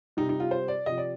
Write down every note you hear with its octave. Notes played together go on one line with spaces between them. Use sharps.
C3 G3 D#4
D#4
F4
C5
D5
C3 F3 D#5
D5